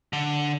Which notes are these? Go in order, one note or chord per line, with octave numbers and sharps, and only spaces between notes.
D3